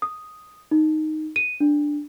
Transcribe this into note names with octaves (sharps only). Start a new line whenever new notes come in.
D#6
D#4
D#7
D4